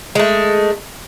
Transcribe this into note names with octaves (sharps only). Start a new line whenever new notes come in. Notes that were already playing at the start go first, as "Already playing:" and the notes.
G#3 A3